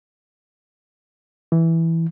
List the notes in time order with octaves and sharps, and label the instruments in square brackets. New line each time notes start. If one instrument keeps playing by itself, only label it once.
[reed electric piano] E3